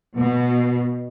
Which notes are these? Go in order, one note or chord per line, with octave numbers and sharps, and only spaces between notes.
B2